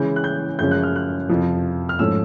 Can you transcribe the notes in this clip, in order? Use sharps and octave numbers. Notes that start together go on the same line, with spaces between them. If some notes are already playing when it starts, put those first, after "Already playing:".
Already playing: C#3 E3 G#3 C#4 G6
F#6
G6
F#2 C#3 F3 G#3 C#4 G6
F#6
F6
F#6
F2 C3 F3
F6
G#2 F3 A3 C#4 E6